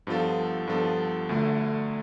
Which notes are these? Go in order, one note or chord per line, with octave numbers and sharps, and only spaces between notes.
G2 F3 B3 F4 A4
G2 F3 B3 F4 A4
D2 D3 A3